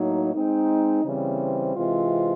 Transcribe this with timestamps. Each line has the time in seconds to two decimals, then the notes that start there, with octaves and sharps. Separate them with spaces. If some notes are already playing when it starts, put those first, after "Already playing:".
Already playing: A2 F#3 A#3 D#4
0.34 G#3 C4 D#4
1.04 C#3 E3 G3 C4
1.75 C3 E3 G#3 C4 F4